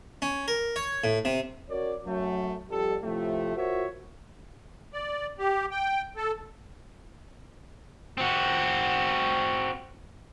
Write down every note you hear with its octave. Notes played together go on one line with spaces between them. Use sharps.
C#4
A#4
C#5
A2
C3
C#4 F#4 A#4 C#5 D5
F#2 F#3 A3
F2 G3 A4
A2 C3 F3 A3
F4 F#4 A#4 C5 C#5 E5
D5
G4
G5
A4
C4 F#4